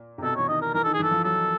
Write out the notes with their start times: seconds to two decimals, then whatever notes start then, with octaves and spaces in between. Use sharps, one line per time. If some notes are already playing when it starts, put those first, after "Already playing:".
Already playing: A#2
0.18 C3
0.23 B2 A4
0.36 E3 C#5
0.48 D#3 D#5
0.61 A#4
0.74 E3 A#4
0.84 D#3 A4
0.94 G#4
0.99 E3 A4
1.11 F3
1.24 F#3 A4